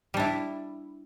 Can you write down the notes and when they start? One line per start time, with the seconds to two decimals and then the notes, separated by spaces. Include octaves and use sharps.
0.14 G3
0.17 D4
0.20 E4